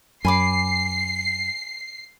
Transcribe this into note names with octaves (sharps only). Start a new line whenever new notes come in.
F#2 G#5 B5 D6 C7